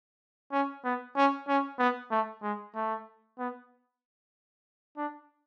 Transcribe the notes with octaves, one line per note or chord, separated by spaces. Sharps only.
C#4
B3
C#4
C#4
B3
A3
G#3
A3
B3
D4